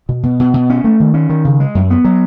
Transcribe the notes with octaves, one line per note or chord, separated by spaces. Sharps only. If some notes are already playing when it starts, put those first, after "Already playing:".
B2
B2
B2
B2
C#4
A3
D#3
C#4
D#3
C#3
G#3
F#2
B3
F#3